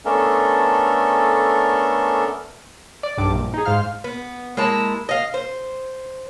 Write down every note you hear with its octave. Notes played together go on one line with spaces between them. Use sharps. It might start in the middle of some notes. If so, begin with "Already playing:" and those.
A3 B3 C#4 D4 A4 A#4
D5
B1 G2 D6
A#1
D#4 G#4
G#2 C5 F5 F6
B3
G#3 A#3 E4 A5
D#5 F5
C5